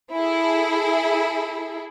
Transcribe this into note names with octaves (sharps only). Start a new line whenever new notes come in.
E4 G#4 A4